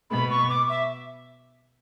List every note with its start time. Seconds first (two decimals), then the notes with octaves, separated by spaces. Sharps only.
0.09 B2 B3 B5
0.30 C#6
0.49 D6
0.69 E5